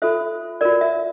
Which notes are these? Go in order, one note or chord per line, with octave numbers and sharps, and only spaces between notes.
F4 A4 C5 E5
F4 A#4 D5
E5